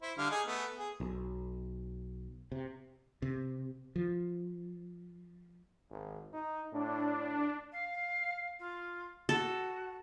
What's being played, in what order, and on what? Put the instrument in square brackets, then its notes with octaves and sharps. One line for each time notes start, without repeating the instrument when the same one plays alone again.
[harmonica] E4 C5
D3 G3 F5
D#4 G#4 G#5
A3 B3
G#4
[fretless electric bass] B1
C3
C3
F3
[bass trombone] G#1
D#4
[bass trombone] A2 [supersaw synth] D4
[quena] F5
F4
[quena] F#4 [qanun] A4